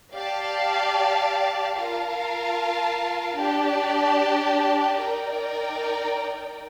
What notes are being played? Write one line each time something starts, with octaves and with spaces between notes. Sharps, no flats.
G4 D5 F5 A5
F4 A#4 F5 A5
D4 G4 D5 A5
D#4 A#4 D5 G5